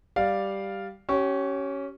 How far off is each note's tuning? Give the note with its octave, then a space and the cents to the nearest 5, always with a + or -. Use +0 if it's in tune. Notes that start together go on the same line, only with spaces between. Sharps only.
G3 +0 D5 +0 F5 +0
C#4 +0 G4 -35 C#6 +0